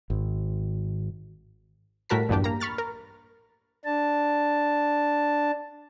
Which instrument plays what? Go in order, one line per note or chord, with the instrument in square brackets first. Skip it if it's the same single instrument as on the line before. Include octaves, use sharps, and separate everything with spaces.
[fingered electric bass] G#1
[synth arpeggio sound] A2 G3 F#4 A#4 A5 B6
A#1 E2 G2 D4 G4
A#3 A#5
B5 C#6 F6 A6
A#4
[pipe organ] D4 A5